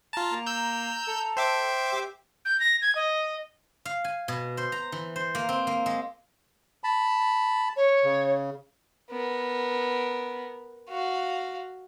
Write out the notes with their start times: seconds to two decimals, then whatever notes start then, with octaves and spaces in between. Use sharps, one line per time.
0.13 F4 A5 A#5
0.32 A#3
0.46 E6 G6
1.08 A4
1.37 C5 E5 G5 D6
1.92 G4
2.45 G6
2.60 A#6
2.82 G#6
2.95 D#5
3.85 F5
4.04 G#5
4.28 B2
4.57 C5
4.72 A#5
4.92 E3
5.16 C5
5.35 A#3
5.49 C4
5.67 A#3
5.86 G#3
6.84 A5 B5
7.77 C#5
8.04 C#3
9.10 B3 A#4
10.89 F#4 F5